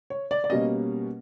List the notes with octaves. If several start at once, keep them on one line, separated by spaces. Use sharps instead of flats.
C#5
D5
D5
B2 G3 A#3 C#4 D#5